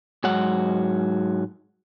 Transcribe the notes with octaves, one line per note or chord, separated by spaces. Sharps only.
G#2 F#3 G#3 F#5